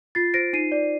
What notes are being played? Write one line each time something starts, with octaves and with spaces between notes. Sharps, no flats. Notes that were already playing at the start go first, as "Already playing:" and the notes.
F4 A6 C7
C5 A#6 D7
D#4 C7 D#7
D5